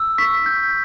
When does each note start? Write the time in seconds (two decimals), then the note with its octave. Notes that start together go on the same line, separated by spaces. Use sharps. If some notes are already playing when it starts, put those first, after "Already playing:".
Already playing: E6
0.18 C#6 B6
0.46 G6